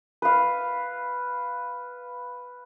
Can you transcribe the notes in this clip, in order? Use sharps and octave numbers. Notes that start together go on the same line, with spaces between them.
B4 F5